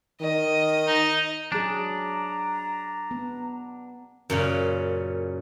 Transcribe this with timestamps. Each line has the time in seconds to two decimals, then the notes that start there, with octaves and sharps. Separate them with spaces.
0.21 D#3 D#5
0.86 D#4
1.52 F#3 D4 G#4 A#5
3.11 B3
4.30 F#2 A#2 C#3